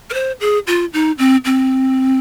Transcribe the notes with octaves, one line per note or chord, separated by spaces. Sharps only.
A#4
C5
G#4
F4
D#4
C4
C4